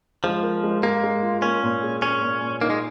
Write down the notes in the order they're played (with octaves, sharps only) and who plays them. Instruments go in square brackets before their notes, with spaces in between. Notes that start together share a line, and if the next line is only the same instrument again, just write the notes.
[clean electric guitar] F3 [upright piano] G#3
[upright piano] A#4
G#3
[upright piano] G#3 [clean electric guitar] A#3
[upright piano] G#3
F4
[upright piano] A#3 [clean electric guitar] C#4
[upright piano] A#2
G#4
[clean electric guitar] C#4 [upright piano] G#4
[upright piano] A#2
A#2
[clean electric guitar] A#3 [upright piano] D#4
[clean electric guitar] G#3